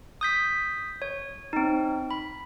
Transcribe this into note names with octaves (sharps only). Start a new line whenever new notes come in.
D#6 G6 B6
C#5
C4 D#4
B5